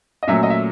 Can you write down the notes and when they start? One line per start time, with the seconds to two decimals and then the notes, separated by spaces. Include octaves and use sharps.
0.23 D#5
0.27 A#2 F#3 A3 C#4 E5
0.43 D#5
0.50 E5